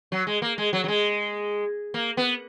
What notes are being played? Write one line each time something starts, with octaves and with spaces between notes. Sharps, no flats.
F#3
G#3
A#3
G#3
F#3
F#3
G#3
A#3
B3